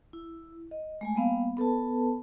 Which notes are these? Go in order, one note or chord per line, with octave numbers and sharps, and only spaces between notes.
E4
D#5
G#3 A3 G#5
G3 A#3 B3 F5
B3 A4 B4 A5